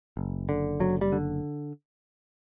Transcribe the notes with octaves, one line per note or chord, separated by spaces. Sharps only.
F#1
D3
F#1 F#3
G3
D3